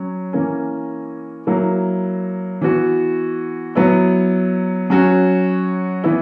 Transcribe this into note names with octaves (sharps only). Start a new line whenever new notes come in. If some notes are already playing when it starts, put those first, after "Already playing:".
Already playing: F#3 C#4
E3 A#3 C#4
F#3 A#3 E4
E3 B3 F#4
F#3 B3 E4
F#3 C#4 F#4
E3 B3 E4